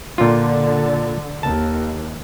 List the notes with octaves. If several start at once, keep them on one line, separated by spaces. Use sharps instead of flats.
A#2 D3 F4
D#2 A5